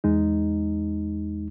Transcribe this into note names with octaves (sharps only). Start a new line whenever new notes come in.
E2 G#3 D#4